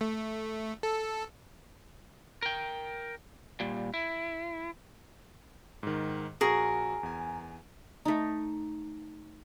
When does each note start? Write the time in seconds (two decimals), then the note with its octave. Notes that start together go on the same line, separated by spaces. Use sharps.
0.01 A3
0.83 A4
2.43 A#4 G5
3.60 A#2 G3
3.94 E4
5.83 G#2 D#3
6.41 A#1 F#4 G#4 A#4 C#6
7.03 E2 G#5
8.05 A3 D#4